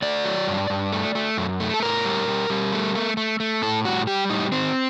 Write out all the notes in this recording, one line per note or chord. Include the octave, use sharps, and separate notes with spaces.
A3 D5
F#3
G2
G2
A3
A3
F#2
A3
A4
A2 A#4
G3
G3
G3
A3
A3
A3
A3
A2 A4
G3 F#4
G3 G4
A2 D#4
D#3 C4